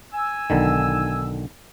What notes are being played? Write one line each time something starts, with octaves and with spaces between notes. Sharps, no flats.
G#5 E6
B1 D3 D#3